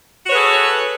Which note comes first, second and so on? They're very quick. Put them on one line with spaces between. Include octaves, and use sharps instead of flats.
F#4 C#5 B4 G#4 A4